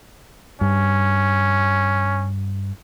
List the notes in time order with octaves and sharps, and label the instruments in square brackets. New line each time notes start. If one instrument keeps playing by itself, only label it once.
[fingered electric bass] G2 [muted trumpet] C#4